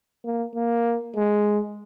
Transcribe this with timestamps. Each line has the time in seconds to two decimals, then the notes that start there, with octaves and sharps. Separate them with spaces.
0.25 A#3
0.55 A#3
1.16 G#3